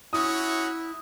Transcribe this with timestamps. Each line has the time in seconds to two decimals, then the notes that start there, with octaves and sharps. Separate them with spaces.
0.13 C#4 E4 F#4 D#6